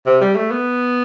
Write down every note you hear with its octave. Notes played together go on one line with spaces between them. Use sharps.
C3
G3
A3
B3